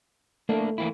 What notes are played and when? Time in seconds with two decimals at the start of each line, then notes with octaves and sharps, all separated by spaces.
0.49 A3 A#3 D4
0.78 E3 A#3 E4